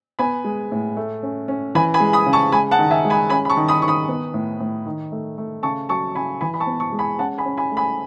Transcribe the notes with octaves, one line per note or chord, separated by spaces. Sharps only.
B3 G#5 B5
G#3
A2
A3
C#4
C#4
E3 G#5 B5
G#5 B5
G#3
B5 D#6
C#3
A5 C#6
G#3 G#5 B5
F#5 A5
D#3
E5 G#5
G#3
G#5 B5
C#4 G#5 B5
B5
A5 C#6
D#3
B5 D#6
D#3 C#6
B5 D#6
B3
A2
A2
D#3
A3
A3
C#3 A5 C#6
F#3 A5 C#6
C#3 G#5 B5
E3 G#5 B5
B5
A5 C#6
B3
A5 C#6
G#3
G#5 B5
C#4 F#5 A5
G#5 B5
C#4
G#5 B5
A3
G#5 B5